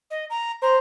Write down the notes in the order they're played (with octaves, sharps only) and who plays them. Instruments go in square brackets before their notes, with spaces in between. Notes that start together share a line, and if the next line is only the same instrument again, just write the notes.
[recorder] D#5
A#5
[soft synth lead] C5 [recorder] A#5